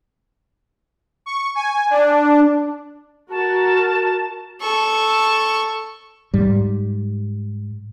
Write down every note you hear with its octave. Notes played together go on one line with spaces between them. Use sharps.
C#6
G#5
D4
F#4 A#4 A5
A4 C#6
G#2 G3